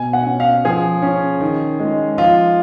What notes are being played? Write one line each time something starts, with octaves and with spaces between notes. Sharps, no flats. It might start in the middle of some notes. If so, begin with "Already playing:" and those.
Already playing: B2 G#5
F#5
C#4
F5
F3 G#4
C#4
D#3
G#3
F3 F4